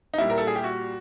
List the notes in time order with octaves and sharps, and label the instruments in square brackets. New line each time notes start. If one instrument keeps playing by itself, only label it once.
[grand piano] D#4
A#2 G3 E4
A#4
A4
G#4
G4
F#4